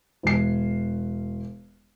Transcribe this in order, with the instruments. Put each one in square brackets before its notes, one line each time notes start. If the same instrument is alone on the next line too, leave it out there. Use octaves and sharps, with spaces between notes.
[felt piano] E1 C7